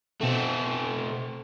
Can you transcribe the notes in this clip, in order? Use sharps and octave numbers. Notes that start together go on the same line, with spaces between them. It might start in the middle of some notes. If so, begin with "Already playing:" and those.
B2 A3 C4 A4